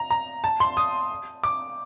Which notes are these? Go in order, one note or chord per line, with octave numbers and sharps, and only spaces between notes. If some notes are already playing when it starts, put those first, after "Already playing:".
Already playing: A#5
A#5
A5
C6
D#6
D6